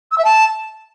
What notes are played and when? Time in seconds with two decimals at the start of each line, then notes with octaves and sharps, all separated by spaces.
0.11 E6
0.18 E5
0.24 A5